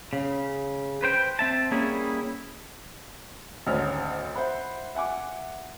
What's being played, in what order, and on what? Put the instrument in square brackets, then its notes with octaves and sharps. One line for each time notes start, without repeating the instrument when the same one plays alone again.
[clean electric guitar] C#3
B4 C5 G5
C4 E5 A5
G3 A#3 C#4 E4 G#4
[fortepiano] G#1 D2 C#4 F6
C5 E5 F#5 B5
E5 F#5 G#5 D6